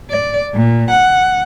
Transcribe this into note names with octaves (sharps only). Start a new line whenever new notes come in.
D5
A#2
F#5